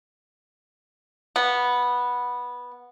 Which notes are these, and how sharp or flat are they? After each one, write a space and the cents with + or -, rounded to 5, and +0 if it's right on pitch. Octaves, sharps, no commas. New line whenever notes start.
B3 -10